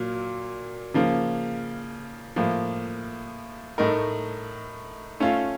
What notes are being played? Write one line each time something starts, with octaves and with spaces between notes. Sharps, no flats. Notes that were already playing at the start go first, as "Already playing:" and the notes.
Already playing: A#2 F#3 A#3
C#3 F3 A#3
A2 F3 A#3
A2 A3 D#4 A#4
A3 C#4 F4